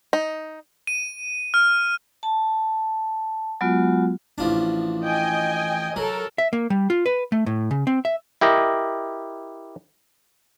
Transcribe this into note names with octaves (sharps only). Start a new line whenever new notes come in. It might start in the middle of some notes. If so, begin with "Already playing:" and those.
D#4
D#7
F6
A5
F#3 G#3 B3 F4 F#4
A1 F3 D4
D#5 G5 G#5
F#3 A4 A#4
E5
A#3
G3
F4
B4
A3
A2
C#3
C4
E5
E4 G4 A#4 D#5